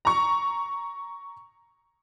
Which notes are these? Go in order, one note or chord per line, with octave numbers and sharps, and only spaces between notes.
A#5 C#6